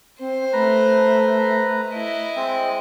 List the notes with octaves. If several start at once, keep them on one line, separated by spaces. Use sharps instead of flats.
C4 C5
A3 B4 A#5
E4 D#5
G#3 C4